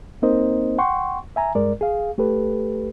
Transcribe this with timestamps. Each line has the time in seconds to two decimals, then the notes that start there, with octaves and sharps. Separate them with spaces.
0.22 A#3 C4 D#4 A#4 C5 D#5
0.78 F#5 G5 C6 C#6
1.36 E5 G#5 A#5
1.55 G2 G#3 A#4 D5
1.81 G#4 F5
2.18 A3 G4 A4 B4